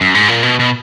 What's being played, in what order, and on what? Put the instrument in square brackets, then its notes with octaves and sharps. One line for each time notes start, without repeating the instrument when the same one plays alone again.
[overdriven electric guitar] F#2
G#2
A#2
B2
B2